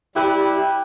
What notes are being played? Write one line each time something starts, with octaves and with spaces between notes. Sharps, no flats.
G3 E4 G4 B4